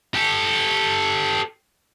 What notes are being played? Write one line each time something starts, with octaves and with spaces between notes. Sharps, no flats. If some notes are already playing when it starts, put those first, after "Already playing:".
G4 A4